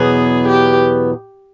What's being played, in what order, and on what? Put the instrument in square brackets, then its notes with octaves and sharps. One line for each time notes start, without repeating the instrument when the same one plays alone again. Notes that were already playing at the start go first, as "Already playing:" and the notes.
Already playing: [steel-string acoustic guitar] E2 B2 F#3 B3 [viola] G#4
[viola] G4